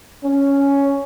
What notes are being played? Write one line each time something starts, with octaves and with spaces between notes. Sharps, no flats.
C#4